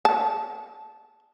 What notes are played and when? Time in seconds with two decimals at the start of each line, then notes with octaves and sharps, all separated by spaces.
0.05 A5